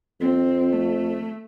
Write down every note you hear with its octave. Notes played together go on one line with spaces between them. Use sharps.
F2 C4
A3